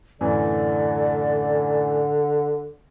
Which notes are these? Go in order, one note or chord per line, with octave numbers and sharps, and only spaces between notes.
F#2 A2 D3 E3 D5